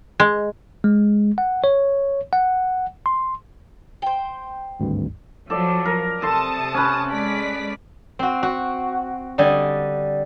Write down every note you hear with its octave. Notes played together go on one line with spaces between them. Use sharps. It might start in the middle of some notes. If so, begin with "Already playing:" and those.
G#3
G#3
F#5
C#5
F#5
C6
C5 G5
G#1 D2 G2
F3 F#3 A4 D5
A#4
C3 A4 A5 C6 D#6
C#4 B4
G#3 D5 B6
C4 F#4
F#4
D3 G3 D#5 G#5